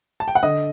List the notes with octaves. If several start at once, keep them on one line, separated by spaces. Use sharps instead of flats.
A5
G5
F#5
D3 D#5